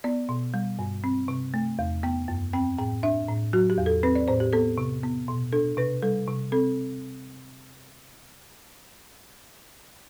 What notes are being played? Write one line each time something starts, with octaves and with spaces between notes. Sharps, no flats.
B3 D5
B2
G3
G2
C4
C3
A3
E2
B3 G5
F#2
C4 G5
A2 G5
D4 E5
A2
F#3 F#4
G4
E2
A4
C4 B4
D5
A2 C5
G4
B3 A4
C3
B3
B2
D4 A4
C3 B4
G3 A4
C3
C4 A4